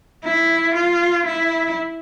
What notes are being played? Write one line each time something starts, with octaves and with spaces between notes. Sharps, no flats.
E4
F4
E4